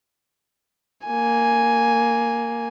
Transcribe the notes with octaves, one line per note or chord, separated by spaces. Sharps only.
A#3 G#5